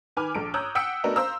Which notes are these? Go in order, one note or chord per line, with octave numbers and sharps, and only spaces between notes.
D#3 B4 G#5 D6 F6
A#1 A4 D7
C#5 A#5 D#6 E6 F#6 G6
F#5 G5 E6 B6 C#7 D7
A3 B3 D4 F#4 A#4 D#5
C5 F5 A#5 E6